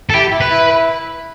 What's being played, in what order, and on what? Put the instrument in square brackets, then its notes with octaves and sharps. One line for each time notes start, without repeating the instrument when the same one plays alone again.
[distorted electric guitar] A4
[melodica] E4 [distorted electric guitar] G4
[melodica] E4
[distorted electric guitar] B4
[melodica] E4